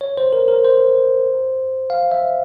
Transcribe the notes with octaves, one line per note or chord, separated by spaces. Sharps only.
C#5
C5
A#4
A#4
C5
F5
E5